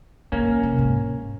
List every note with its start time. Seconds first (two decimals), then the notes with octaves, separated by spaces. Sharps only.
0.32 C#3 A#3 C#4
0.47 C#3
0.63 C3
0.78 G#2